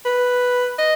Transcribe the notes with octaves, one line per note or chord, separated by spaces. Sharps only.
B4
D#5